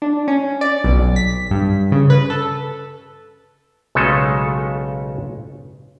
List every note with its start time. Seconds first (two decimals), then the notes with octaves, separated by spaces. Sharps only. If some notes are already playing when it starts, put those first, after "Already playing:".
0.02 D4
0.28 C#4
0.61 D5
0.84 B1
1.16 B6
1.51 G2
1.92 C#3
2.10 B4
2.30 A4
3.95 B1 C#3 G#3 A3 F4 A4